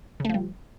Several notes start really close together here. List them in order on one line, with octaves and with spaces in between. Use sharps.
C#3 A3 F3 G3